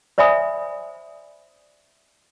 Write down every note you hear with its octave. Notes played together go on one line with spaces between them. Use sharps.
C5 D5 E5 G#5 B5 D#6